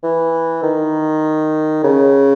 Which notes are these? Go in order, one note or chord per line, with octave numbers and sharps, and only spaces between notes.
E3
D#3
C#3